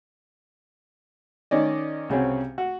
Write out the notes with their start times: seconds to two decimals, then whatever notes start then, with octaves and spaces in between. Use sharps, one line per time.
1.51 D#3 C#4 D5 D#5
2.09 C2 C#3 C4 C#4 F#4
2.58 F#4